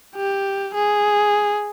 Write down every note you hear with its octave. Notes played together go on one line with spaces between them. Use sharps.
G4
G#4